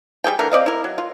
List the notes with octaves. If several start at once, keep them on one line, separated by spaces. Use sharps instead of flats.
G3 A#3 G#4 G5
D3 E3 A3 A#4
C4 D5 D#5 F5
E4 A#4
F#3
F4